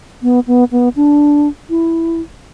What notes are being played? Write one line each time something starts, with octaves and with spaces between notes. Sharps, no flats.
B3
B3
B3
D4
E4